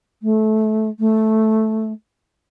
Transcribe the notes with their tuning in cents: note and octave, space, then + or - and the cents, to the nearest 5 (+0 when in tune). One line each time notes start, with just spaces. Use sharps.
A3 -20
A3 -5